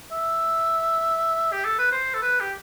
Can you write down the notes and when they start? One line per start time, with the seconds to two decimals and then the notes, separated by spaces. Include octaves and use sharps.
0.12 E5
1.52 G4
1.65 A4
1.79 B4
1.92 C5
2.14 A4
2.22 B4
2.41 G4